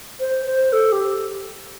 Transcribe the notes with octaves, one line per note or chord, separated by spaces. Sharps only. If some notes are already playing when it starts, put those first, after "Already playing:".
C5
C5
A4
G4